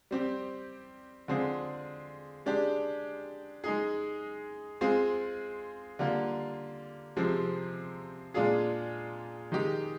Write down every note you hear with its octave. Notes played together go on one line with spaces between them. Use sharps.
G3 C4 G4
D3 G#3 C4 F4 G#4
G#3 D4 G4
G#3 D#4 G#4
G#3 C4 F4 G#4
D3 G3 A#3 F4
C3 F3 G#3 C4
A#2 G#3 D4 F4 G#4
D#3 G#3 D#4 G4